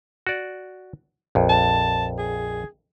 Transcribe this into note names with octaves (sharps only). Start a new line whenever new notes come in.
F#4 D5
A#1 F2
A5
G#4